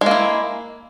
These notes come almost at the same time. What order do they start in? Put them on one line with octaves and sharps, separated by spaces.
G#3 A#3 E4